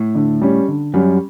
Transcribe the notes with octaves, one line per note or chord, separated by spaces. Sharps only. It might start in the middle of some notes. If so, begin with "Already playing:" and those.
Already playing: A2
D3
G3 C#4
D3
F#2 G3 C#4